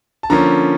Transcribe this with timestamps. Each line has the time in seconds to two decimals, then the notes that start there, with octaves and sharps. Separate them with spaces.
0.23 A5
0.30 D3 F3 A#3 C#4 A#5